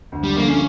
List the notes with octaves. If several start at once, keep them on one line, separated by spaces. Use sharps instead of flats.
D2
G3
D3 F3 A3 A#3
C#4